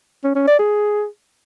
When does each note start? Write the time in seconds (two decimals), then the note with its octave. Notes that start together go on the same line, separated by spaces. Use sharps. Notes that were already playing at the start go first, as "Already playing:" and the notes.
0.24 C#4
0.35 C#4
0.47 D5
0.59 G#4